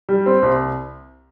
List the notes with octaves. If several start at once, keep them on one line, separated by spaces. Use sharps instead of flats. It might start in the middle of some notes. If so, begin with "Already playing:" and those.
G3
C4
C2